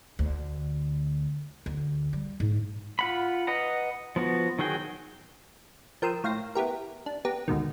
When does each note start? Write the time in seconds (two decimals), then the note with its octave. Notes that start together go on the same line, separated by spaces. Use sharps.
0.19 D2
1.66 D2
2.13 G3
2.40 G#2
2.99 F4 F#5 B5
3.47 B4 D#5 F#5 A#5
4.16 F3 B3 F#4
4.59 D#3 F#3 F#4 G#4 G5
6.02 F3 A#4 G5 C6 D#6 E6
6.24 A2 C#5 F5 G5 C6 A#6
6.55 B3 E4 G4 A#4
7.06 D4
7.25 B3 G4 A#5
7.48 D2 G#2 B2 D#3